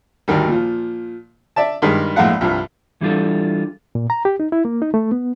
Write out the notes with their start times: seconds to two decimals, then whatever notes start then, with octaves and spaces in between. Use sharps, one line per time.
0.28 G#1 D2 D#3 G3
0.48 A#2 F3
1.56 D5 E5 A5
1.82 G2 D#3 G3 G#3
2.16 A#1 A2 G#3 F5 F#5
2.41 C2 G2 F3
3.01 E3 G3 D4 F4 A4
3.95 A#2
4.10 A#5
4.25 G4
4.40 D#4
4.52 E4
4.65 A#3
4.82 D#4
4.94 A3
5.12 B3